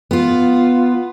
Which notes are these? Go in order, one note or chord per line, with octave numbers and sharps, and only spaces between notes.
B3 F4